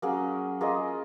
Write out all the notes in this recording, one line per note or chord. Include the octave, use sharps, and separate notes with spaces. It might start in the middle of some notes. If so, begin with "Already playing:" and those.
F#3 A#3 C#4 G#4
A#3 F4 G#4 D#5